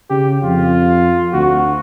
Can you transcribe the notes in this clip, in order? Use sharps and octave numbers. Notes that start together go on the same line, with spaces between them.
C#3 G4
F2 F4
D2 F#4